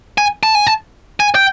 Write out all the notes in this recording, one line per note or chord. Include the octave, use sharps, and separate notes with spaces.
G#5
A5
G#5
A5
G#5
G5